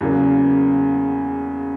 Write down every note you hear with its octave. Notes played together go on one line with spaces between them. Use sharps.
E2 C#3 F#3 A#3